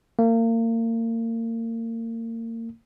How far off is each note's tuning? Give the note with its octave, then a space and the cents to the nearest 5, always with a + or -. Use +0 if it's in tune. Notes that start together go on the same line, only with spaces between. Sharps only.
A#3 -35